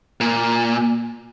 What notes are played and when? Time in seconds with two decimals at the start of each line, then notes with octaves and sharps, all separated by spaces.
0.21 A#2